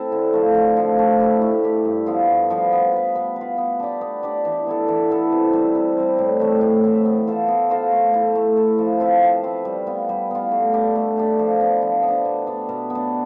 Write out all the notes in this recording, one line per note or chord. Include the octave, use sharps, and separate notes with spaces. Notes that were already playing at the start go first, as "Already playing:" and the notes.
Already playing: C4 E4 A4
D3
F3 A3
D3
F3 A3
A3
E4 G4
A3
E4 G4
G2
F3 B3 F4
G2
F3 B3 F4
B3
F4 B4
B3
F4 B4
B3
D4 G4 D5
B3
D4 G4 D5
E3
B3 E4 A4
E3
B3 E4 A4
C3
G3 C4
C3
G3 C4
A2
E3 A3 C4
A2
E3 A3 C4
B3
F4 A4 C5
B3
F4 A4 C5
A3
E4 A4
A3
E4 A4
F3
C4 F4 B4
F3
C4 F4 B4
G3
B3 F4
G3
B3 F4
A3
D4 G4
A3
D4 G4
F3
B3 D4
F3
B3
D4
B2
B3 D4
B2
B3
D4